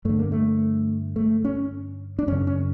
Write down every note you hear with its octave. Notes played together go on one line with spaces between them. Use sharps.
G2 D3 A3
A#3
A3
A3
C#4
D4
F#2 C#3 C#4
C#4